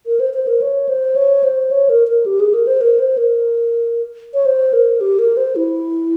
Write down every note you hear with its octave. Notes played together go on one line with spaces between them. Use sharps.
A#4
C5
C5
A#4
C#5
C5
C#5
C5
C#5
A#4
A#4
G4
G#4
A#4
C5
A#4
C5
A#4
C#5
C5
A#4
G4
A#4
C5
E4